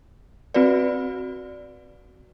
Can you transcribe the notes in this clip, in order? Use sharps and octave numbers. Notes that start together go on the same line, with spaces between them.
C4 F#4 B4 D5